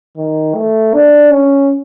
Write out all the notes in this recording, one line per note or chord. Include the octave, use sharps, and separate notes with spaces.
D#3
A3
D4
C#4